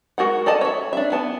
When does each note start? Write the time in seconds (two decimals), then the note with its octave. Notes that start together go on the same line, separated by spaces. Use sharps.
0.18 G#3 F#4 A#4 F#5
0.46 A4 D5 D#5 A5
0.61 C#5 E5
0.93 D4 E5
1.12 B3 E4 A5